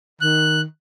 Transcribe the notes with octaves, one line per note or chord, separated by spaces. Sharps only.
D#3 F#6